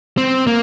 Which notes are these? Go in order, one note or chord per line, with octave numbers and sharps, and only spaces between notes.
C4
A#3